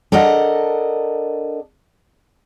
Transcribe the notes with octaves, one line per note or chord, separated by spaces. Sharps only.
D4 A4 A#4 D#5 F#5